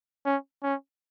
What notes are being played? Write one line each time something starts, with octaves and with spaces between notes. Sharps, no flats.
C#4
C#4